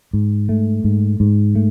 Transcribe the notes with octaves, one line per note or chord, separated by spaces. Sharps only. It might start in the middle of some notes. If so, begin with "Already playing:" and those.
G#2
A3
G#2
G#2
A3